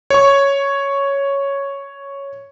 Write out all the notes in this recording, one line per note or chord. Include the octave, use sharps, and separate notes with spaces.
C#5 C#6